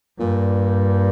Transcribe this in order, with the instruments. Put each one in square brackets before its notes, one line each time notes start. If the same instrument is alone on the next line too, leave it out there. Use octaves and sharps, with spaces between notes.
[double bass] G2 [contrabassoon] A#2